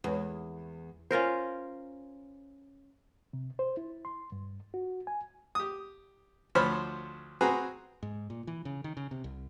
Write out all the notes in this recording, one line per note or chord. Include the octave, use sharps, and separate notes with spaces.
E2 G#3 B4 C#5
C#4 F4 A#4 C5
C3
C5
E4
C6
G2
F#4
G#5
G4 D#6
D2 F3 C5 C#5 B5 F6
C4 F#4 G#4 B4 A#5
G#2
A#2
E3
C#3
D#3
C#3
C3
C2